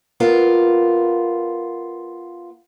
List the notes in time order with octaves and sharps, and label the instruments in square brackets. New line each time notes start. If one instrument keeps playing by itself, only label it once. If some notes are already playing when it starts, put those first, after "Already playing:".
[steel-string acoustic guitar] B3 F4 A#4